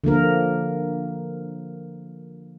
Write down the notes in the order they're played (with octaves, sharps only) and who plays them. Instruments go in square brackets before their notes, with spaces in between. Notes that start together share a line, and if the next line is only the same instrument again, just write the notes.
[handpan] D3 F3 A#3 A#4